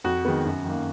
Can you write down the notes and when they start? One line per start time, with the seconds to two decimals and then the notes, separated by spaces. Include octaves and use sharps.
0.04 F2 F#4
0.25 D#3 G#3 B3
0.45 F#2
0.65 D#3 A#3